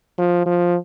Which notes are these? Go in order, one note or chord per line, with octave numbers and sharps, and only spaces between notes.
F3
F3